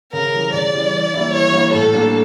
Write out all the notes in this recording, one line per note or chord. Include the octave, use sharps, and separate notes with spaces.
C#3 A#4
E3 G3 C#4
C#3 D5
E3 G3 C#4
E3
G3 A#3 E4
E3 C#5
G3 A#3 E4
A2 A4
G3 A#3 D4